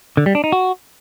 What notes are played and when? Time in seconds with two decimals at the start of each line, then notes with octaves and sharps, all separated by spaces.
0.17 D3
0.26 G3
0.35 D4
0.44 D#4
0.52 F#4